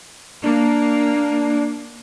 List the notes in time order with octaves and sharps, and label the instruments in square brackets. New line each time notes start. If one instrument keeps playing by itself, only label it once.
[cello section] A#3 [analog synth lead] D4